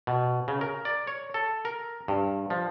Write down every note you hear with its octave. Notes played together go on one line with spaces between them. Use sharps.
B2
C#3
A#4
D5
C#5
A4
A#4
G2
F3